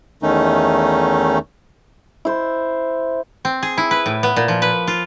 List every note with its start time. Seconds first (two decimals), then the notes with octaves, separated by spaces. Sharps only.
0.23 E2 D#3 A3 C#4 D#4
2.25 E4 C5
3.45 C4
3.63 G#4
3.78 E4
3.91 B4
4.06 A2
4.23 B3
4.36 A#2
4.48 F3
4.62 B4
4.87 F4